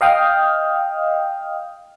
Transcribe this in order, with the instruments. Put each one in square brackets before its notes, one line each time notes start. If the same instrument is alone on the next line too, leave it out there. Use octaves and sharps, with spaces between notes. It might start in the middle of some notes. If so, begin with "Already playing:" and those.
[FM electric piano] D#5 F5 G5 D#6 F6